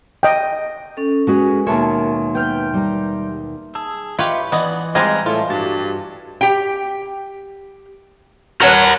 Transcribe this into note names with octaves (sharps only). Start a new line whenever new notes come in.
D#5 G5
C#4 A4
G#3 C#4 F#4 G#4 B4
D#2 B2 A#4 C#5 E5 A5 C6
B3 G5 F6 G6
G3 A#5
G#4 A5 E6
F4 G4 B4 C#5 D#5 E5 C#6
E3 B3 D5 D#5
G3 G#3 C4 F4 G#4 D#5 A#5 C6
A2 F4 E5 A5
G2 F#4 G4 A5
G4 G5
A#4 B4 C#5 F#5 A5